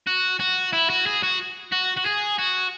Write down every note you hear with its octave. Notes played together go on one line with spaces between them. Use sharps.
F#4
F#4
E4
F#4
G#4
F#4
F#4
F#4
G#4
F#4